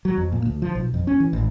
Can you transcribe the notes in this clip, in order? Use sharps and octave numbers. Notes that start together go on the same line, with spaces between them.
F#3
F2
A#2
D2
F3
B1
F2
C#4
E3
A1